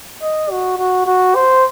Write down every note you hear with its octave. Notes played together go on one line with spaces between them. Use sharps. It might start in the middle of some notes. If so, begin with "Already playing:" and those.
D#5
F#4
F#4
F#4
C5